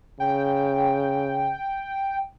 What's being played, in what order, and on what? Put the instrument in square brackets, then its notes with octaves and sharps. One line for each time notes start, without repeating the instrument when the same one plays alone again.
[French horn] C#3 [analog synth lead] G5